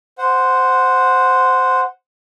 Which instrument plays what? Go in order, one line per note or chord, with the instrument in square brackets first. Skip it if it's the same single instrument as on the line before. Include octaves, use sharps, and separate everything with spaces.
[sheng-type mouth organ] C5 F#5